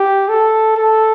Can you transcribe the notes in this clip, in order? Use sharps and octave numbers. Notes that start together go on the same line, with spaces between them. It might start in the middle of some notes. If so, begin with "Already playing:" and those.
Already playing: G4
A4
A4